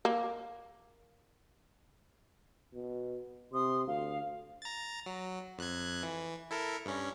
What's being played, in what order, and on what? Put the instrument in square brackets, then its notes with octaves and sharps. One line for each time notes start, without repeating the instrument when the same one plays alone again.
[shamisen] A#3
[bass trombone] B2
[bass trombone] C3 [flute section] C6 D#6
[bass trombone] D2 [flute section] F5
[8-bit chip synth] A#5 A6
F#3
F2 F#6 G#6
E3
E4 A4 A#4
G2 C#4